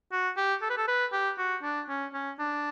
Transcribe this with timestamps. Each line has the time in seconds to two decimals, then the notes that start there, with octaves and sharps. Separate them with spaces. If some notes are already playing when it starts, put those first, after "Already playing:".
0.12 F#4
0.37 G4
0.62 A4
0.70 B4
0.77 A4
0.88 B4
1.13 G4
1.38 F#4
1.63 D4
1.89 C#4
2.14 C#4
2.39 D4